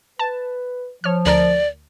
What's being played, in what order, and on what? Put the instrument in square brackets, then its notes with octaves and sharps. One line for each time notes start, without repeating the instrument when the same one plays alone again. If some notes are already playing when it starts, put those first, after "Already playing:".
[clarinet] B4 [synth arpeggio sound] A5
[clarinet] F3 [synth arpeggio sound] C#5 F6
[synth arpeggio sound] D2 A#4 D7 [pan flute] D5